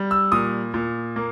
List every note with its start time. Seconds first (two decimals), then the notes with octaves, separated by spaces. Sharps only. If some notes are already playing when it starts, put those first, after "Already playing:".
Already playing: G3
0.11 E6
0.32 A#2 D#6
0.74 A#2
1.16 A#3